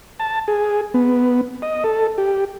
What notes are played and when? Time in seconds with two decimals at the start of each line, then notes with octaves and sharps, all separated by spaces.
0.20 A5
0.48 G#4
0.94 B3
1.62 D#5
1.84 A4
2.18 G4